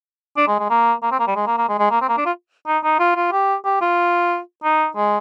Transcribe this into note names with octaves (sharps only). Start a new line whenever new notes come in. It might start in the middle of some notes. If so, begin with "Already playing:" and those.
D4
G#3
G#3
A#3
A#3
C4
A#3
G3
G#3
A#3
A#3
G#3
G#3
A#3
C4
A#3
D4
F4
D#4
D#4
F4
F4
G4
G4
F4
D#4
G#3